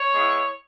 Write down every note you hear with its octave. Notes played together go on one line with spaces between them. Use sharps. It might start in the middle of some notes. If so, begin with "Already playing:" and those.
Already playing: C#5
G#3 B3 E4